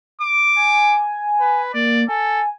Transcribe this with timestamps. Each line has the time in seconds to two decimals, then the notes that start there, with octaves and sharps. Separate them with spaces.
0.21 D6
0.56 G#5
1.40 B4
1.74 A#3 D5
2.09 A4 G#5